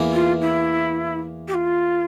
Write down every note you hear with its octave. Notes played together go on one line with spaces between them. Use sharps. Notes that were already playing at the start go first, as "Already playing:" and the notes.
Already playing: E2 E3 A#3
F4
E4
G4
F4